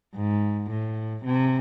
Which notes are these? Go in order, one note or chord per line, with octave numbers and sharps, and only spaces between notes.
G#2
A2
C3